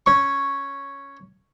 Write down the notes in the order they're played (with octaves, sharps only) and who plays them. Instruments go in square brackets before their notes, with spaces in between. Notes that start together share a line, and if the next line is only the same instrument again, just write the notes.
[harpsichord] C#4 C#6